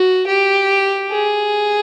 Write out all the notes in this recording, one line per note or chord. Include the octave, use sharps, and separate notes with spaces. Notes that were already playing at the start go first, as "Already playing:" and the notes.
Already playing: F#4
G4
G#4